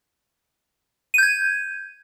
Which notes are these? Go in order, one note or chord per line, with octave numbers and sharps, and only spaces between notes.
G6 G#6 D#7